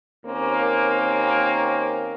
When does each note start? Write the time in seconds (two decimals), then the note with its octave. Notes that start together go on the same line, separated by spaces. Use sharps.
0.25 D#2 A#3 C4 C#4